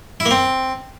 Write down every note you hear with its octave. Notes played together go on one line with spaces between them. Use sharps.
E4
A#3
C4